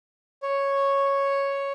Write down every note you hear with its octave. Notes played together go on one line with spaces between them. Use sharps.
C#5